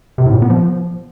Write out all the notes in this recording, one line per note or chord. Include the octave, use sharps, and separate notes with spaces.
C3
A2
A#2
B3
F3